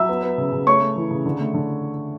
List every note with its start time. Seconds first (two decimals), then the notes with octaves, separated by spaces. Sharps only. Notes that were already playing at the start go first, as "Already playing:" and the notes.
Already playing: F#3 E5 E6
0.09 B3
0.23 B3
0.38 C#3
0.52 C#3
0.67 A3 C#5 C#6
0.81 A3
0.96 E3
1.10 C#3
1.25 D3
1.40 A3
1.54 D3